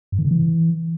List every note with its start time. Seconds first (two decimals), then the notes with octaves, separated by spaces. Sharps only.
0.12 G2
0.18 D#3
0.25 C#3
0.31 E3